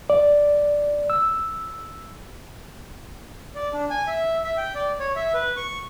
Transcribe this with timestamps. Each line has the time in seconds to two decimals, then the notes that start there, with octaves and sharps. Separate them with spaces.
0.10 D5
1.10 E6
3.55 D5
3.73 D4
3.90 G#5
4.07 E5
4.44 E5
4.57 G5
4.75 D5
5.00 C#5
5.16 E5
5.34 B4
5.57 C#6